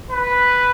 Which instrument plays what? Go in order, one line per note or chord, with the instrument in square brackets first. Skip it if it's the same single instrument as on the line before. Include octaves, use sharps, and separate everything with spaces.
[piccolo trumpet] B4